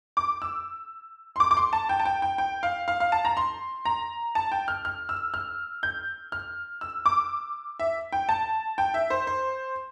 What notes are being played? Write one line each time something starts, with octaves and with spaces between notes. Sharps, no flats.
D6
E6
C6
D6
D6
C6
A5
G5
A5
G5
G5
G5
F5
F5
F5
A5
A#5
C6
A#5
A5
G5
F6
F6
E6
F6
G6
F6
E6
D6
E5
G5
A5
G5
E5
C5
C5